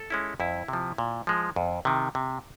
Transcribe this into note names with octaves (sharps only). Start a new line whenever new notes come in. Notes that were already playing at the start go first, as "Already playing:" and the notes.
Already playing: A4
G#3 C#4 E4
F2 E4
C3 F3
A#2
F3 G#3
F2
C3 D#3
C3